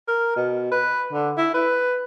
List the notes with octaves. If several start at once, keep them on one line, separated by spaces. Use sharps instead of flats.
A#4
B2
B4
D3
E4
B4